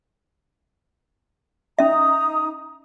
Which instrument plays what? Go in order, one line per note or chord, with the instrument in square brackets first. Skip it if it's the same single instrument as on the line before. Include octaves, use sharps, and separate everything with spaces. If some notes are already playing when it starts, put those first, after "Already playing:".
[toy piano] C#4 E5 [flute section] D#4 A#5 D#6